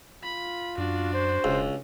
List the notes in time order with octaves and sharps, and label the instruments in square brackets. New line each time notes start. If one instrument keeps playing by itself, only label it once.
[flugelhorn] F4 [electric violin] B5
[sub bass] F#2 [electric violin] D4 F#4
[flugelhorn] C5
[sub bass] E1 [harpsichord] C#2